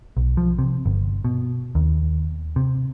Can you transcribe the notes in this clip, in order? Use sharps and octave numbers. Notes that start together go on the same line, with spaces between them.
B1
F3
C3
G1
B2
D#2
C3